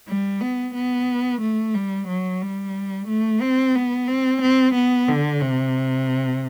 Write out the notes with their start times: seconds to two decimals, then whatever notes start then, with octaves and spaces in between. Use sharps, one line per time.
0.08 G3
0.41 B3
0.75 B3
1.41 A3
1.74 G3
2.08 F#3
2.42 G3
3.08 A3
3.41 C4
3.75 B3
4.08 C4
4.42 C4
4.75 B3
5.08 D3
5.42 C3